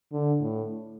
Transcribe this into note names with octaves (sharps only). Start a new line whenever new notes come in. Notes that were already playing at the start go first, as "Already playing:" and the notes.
D3
A2